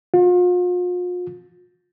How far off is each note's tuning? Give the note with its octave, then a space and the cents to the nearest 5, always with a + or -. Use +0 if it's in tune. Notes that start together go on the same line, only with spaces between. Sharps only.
F4 +40